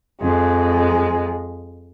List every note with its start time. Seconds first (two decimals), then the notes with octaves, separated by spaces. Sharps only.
0.20 F2 G#3